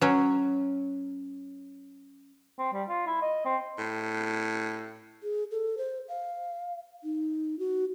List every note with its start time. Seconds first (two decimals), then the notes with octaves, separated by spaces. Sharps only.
0.01 F#3 C#4
2.59 C4
2.73 G3
2.89 F4
3.07 E4
3.22 D#5
3.45 C4
3.78 A2
5.23 G#4
5.51 A4
5.78 C5
6.09 F5
7.04 D#4
7.59 F#4